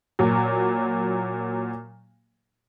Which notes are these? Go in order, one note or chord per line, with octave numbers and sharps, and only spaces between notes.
A#2 F#3